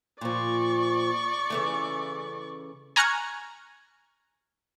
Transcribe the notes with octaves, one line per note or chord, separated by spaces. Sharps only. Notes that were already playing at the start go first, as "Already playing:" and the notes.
A#2 F3 D5 C#6
C#3 E3 A3
G#5 A#5 C#6 F6 F#6 G#6